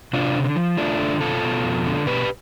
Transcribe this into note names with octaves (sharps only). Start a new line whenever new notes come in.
C3 D4 F4
D3
F3
A3 D4 F4
D3
B2 F4 A4
B2
F2
D3
B2 G4 B4